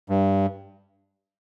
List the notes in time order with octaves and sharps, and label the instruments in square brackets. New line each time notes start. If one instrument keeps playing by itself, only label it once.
[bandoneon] G2